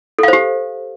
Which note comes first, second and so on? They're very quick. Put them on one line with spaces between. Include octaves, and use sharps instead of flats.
A4 F5 C5 G4